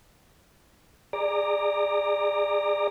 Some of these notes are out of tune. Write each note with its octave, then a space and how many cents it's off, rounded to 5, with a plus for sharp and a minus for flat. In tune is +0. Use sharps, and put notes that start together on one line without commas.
G#4 -15 D5 +15 A#5 -10